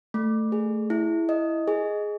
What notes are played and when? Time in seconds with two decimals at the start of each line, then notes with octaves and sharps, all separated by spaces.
0.14 A3
0.52 G#4
0.90 E4
1.29 D#5
1.68 G#4